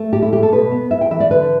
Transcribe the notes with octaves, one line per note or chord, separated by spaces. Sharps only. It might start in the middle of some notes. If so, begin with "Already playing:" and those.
Already playing: A3
A2 G4
E4
A3 G4
A4
B2 B4
B3
E4 E5
G5
E3 E5
D5
D3 B4